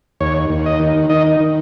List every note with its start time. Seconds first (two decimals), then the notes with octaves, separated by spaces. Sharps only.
0.21 D#2 C#5
0.50 D#2
0.66 D#5
0.80 D#3
1.09 D#3 D#5
1.40 D#3